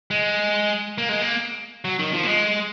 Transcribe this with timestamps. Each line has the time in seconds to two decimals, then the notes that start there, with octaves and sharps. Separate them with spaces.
0.11 G#3
0.98 A#3
1.09 G#3
1.21 A#3
1.85 F#3
1.99 D#3
2.14 F3
2.23 A#3
2.28 G#3